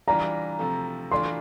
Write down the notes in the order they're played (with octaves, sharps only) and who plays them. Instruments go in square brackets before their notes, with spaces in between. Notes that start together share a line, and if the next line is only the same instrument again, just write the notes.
[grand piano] E3 G3 D4 F4 [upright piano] A#5
[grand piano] C3 F3 A3
[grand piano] E3 A3 D4 F4 [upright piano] C6